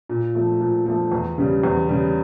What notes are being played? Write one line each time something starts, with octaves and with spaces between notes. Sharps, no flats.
A#2
F3 A3
A#2
F3 A3
E2
C#3 G3
E2
C#3 G3